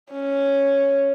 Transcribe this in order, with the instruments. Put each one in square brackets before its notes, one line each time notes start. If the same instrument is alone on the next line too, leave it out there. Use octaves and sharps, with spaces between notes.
[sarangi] C#4